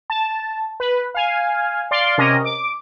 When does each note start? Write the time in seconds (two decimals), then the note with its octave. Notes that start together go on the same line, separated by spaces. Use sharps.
0.10 A5
0.80 B4
1.15 F5 G#5
1.91 D5 F5 C6
2.18 C3 C#4 A#4 D#5
2.45 D6